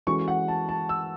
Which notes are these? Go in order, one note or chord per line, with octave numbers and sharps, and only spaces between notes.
E3 G#3 C#4 F#4 A4 C#6
F#5
A5
A5
E6